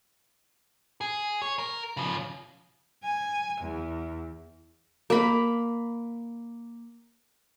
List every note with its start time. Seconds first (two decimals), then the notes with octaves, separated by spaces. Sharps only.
1.01 G#4
1.42 C#5
1.58 A#4
1.97 C#3 F3
3.04 G#5
3.61 E2
5.10 A#3 B5